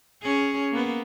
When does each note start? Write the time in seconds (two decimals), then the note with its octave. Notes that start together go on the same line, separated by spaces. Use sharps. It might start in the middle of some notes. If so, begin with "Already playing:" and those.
0.22 C#4 G#4
0.72 A#3 B3